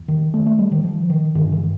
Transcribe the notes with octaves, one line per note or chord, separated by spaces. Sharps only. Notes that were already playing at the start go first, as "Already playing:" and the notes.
Already playing: E2
D#3
A3
A3
G3
D#3
F3
D#3
G2 D3 D#3
E3